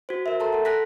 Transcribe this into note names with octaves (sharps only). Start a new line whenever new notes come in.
F#4 C5
A#4 E5
A4 A5 A#5 C6
A4 F#5
A4 G#5 F#6 A#6 B6